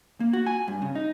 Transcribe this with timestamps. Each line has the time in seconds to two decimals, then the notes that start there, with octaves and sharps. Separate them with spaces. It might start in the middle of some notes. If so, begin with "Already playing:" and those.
0.20 A#3
0.33 F#4
0.46 G#5
0.68 G2
0.82 C#3
0.95 D#4